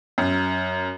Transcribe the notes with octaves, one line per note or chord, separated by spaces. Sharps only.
F#2